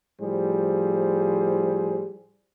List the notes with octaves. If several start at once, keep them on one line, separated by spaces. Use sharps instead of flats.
A2 F3 G3 G#4 C5